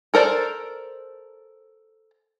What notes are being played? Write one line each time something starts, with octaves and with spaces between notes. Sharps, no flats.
A4 A#4 C5 D5